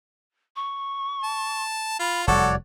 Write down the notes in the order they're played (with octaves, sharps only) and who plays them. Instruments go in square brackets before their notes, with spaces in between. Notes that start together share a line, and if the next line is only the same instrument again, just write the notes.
[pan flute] C#6
[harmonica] A5
[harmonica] F4 [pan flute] B5
[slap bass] F1 E2 G3 [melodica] F#4 C#5 D5 [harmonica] A4 [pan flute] F#5